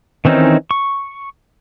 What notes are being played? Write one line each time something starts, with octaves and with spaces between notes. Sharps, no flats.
D#3 E3 C4 C#4 D#4
C#6